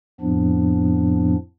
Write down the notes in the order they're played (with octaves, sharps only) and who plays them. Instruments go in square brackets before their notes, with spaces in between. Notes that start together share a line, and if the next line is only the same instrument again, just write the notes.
[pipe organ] F2 A2 F3 B3 D4